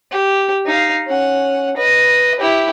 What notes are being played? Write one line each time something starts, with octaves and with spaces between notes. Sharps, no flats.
G4
D#4 F5
C#4 F#5
B4 D#5
E4 G4